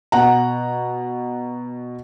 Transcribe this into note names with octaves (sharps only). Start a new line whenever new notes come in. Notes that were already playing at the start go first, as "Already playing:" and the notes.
B2 F#5 A#5